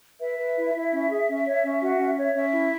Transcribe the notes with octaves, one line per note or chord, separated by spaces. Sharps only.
B4 E5
B4
E4
E4
C#4
G#4
C#4
C#5
C#4
F#4
C#4
C#5
C#4 E5
E4